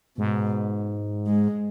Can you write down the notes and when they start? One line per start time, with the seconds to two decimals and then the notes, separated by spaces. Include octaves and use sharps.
0.18 G#2 B2
1.27 G#3